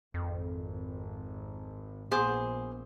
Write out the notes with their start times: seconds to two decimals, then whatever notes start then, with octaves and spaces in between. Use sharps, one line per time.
0.14 G#1 F2
2.11 A#1 B3 G#4 C5 D6